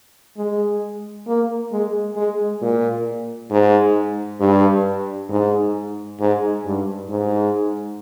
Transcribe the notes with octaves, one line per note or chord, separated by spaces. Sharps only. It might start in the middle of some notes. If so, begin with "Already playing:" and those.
G#3
A#3
G#3
G#3
A#2
G#2
G2
G#2
G#2
G2
G#2